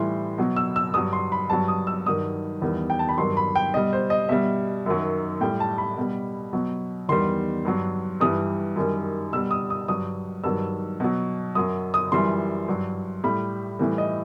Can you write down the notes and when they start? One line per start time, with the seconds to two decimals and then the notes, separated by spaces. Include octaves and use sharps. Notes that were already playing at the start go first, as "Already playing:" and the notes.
Already playing: A2 E3 G3 C6
0.38 B2 F#3
0.56 E6
0.76 E6
0.94 G2 F#3 D#6
1.13 C6
1.32 B5
1.50 G2 F#3 A5
1.68 D#6
1.87 E6
2.06 G2 D#3 F#3 D#6
2.62 E2 D#3 G3
2.90 G5
2.99 A5
3.09 B5
3.18 G2 D#3 F#3 C6
3.37 B5
3.56 G5
3.74 B2 G3 D#5
3.93 C5
4.10 D#5
4.29 B2 G3 E5
4.86 F#2 D#3 F#3
5.41 A2 G3 G5
5.60 A5
5.78 B5
5.98 B2 G3
6.53 B2 F#3
7.09 E2 D#3 G3 C6
7.65 G2 F#3
8.20 G2 E3 G3 D#6
8.76 F#2 D#3 G3
9.33 B2 G3 E6
9.51 D#6
9.70 D#6
9.88 G2 F#3 D#6
10.44 G2 D#3 F#3 E6
11.00 B2 F#3
11.55 F#2 F#3 D#6
11.94 D#6
12.12 F#2 E3 G3 C6
12.68 G2 F#3
13.24 A2 G3 B5
13.79 A2 E3 G3
13.98 D#5